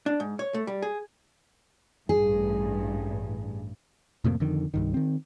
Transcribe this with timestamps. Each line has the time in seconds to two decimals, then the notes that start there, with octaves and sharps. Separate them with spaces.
0.06 D4
0.20 G#2
0.39 C#5
0.54 A3
0.67 G3
0.82 G#4
2.09 A1 G2 G#4
4.24 F2 A2 C3 A#3
4.40 F2 D3 D#3
4.74 C2 G2 D#3
4.94 D#3 C4